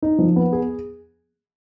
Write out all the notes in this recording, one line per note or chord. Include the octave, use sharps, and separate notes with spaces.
D#4
F3
B3
G#4